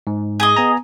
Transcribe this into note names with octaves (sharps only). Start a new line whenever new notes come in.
G#2
G#4 D#5
B3 G#5 A#5